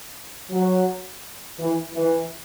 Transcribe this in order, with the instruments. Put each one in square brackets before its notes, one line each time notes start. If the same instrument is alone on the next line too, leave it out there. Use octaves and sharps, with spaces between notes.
[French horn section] F#3
E3
E3